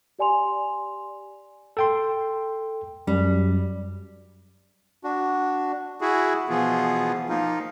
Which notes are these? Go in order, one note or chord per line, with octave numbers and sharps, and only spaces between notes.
G4 D5 G#5 C6 F7
A4 G5 C6
F#2 G3
D4 F#4
E4 F#4 G#4
B2 E3 F3 B3 F4 G#4
F3 A#3 D#4 F4